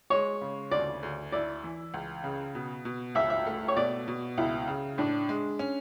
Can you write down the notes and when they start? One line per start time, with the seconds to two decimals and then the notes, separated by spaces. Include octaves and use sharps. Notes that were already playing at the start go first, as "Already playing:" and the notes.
0.10 G#3 C#5
0.41 C#3
0.71 D2 D5
1.03 D2
1.32 E4 D5
1.64 E3
1.94 C#2
2.24 C#3
2.55 B2
2.85 B2
3.15 C#2 E5
3.30 E5
3.47 A3
3.68 C#5
3.77 B2 D5
4.08 B2
4.38 C#2 E4
4.67 C#3
4.98 A2 D4
5.29 G#3
5.59 C#4